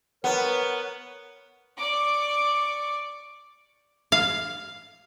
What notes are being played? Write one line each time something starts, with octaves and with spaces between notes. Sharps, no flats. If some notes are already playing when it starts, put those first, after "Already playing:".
B3 A#4 C#5
D5 C#6 D6
F5